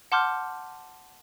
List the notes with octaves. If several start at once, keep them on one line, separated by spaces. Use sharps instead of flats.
F#5 A5 C6 D6 F6 G6